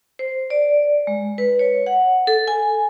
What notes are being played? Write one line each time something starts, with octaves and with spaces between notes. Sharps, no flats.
C5
D5
G#3
B4
C#5
F#5
A4
G#5